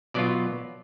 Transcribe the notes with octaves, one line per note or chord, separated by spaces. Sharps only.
B2 F#3 B3 F4 D5